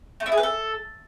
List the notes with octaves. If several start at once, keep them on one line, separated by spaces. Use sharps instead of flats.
A3
E4
G#4
B4
A4